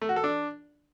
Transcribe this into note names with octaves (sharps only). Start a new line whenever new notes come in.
A3
F#4
A4
D4